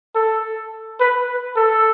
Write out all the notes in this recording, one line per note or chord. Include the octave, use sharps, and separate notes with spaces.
A4
B4
A4